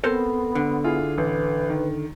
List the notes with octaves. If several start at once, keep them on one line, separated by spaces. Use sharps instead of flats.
B3 C4 A4 A#4 C5
D3
E4 F4 G#4
A1 B4
D#3